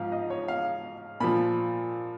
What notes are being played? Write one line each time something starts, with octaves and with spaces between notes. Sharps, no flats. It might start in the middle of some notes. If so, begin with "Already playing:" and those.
Already playing: G#2 F3 F5
D#5
C#5
F5
A#2 F3 B5